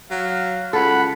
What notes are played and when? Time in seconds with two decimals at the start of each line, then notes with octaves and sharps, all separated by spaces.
0.11 F#3 F5
0.73 C#2 A4 F#5 B5